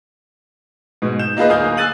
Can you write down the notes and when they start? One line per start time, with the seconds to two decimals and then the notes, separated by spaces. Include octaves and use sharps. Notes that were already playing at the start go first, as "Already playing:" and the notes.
1.02 G#2 B2
1.19 G6 E7
1.37 A#3 D#4 F4 G#4 B4 D#5
1.49 D1 A#3 F5 G#5 D#6 G6
1.77 G#5 E6 F#6 A6 D#7 F#7